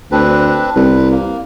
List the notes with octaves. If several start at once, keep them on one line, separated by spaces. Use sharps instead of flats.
D2 C4 D4 B4
C2 B4
A#3